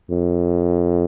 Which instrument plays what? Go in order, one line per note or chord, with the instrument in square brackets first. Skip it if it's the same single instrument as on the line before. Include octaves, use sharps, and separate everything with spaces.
[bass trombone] F2